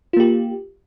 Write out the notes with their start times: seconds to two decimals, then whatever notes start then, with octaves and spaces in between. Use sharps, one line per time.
0.13 F4
0.17 A#3
0.20 G4